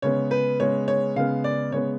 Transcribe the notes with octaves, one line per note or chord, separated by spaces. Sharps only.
C#3 G#3 B3 C#5
B4
C#3 G#3 B3 C#5
C#5
C#3 G#3 B3 F5
D5
C#3 G#3 B3 C#5